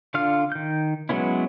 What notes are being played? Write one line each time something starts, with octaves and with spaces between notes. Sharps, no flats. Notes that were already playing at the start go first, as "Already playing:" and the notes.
D3 D4 F4 F5 F6
D#3 G6
F#3 G#3 B3 C#4 E4